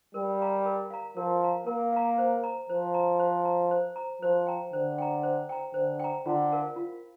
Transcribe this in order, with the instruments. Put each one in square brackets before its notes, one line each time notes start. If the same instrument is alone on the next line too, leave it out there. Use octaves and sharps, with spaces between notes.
[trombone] G3 [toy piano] A#4
[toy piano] F5 A#5
A#4
F5 A#5
[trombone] F3 [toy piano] A#4
[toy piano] F5 A#5
[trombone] A#3 [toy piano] A#4
[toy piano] F5 A#5
C5
A#5
[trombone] F3 [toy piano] C5
[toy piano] A#5
C5
A#5
C5
A#5
[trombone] F3 [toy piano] C5
[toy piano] G5 A#5
[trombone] D3 [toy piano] C5
[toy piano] G5 A#5
C5
G5 A#5
[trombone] D3 [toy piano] C5
[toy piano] G5 A#5
[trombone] D3 [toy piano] F4
[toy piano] A#4 F5
F4